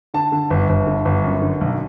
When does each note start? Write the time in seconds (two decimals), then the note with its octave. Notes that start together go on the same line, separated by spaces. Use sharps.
0.14 D3 A5
0.32 D3
0.50 G1
0.69 G1
0.87 D3
1.05 G1
1.24 F#2
1.42 D3
1.61 B1